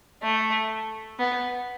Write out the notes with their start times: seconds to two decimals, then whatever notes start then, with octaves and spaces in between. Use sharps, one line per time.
0.23 A3
1.19 B3